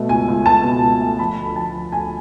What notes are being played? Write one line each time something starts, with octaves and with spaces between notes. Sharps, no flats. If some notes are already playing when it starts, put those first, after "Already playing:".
Already playing: B2 A3
C#2 G#5
C#2
C#2 A5
B2
C#2
A3
F3 B5
D2
F3 A5
F3
D2 G#5